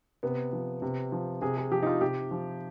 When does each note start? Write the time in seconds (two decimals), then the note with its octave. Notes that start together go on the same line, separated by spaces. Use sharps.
0.23 C3 B3
0.53 F3
0.82 C3
1.12 F3
1.41 C3 G#4
1.57 G#4
1.71 F3 G4
1.83 D#4
1.86 F4
2.01 C3 G4
2.31 F3